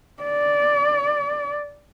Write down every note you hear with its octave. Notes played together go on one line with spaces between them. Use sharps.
D5